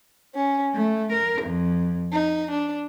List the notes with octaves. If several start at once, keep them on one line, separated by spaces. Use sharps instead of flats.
C#4
A3
A#4
F2
D#4
D4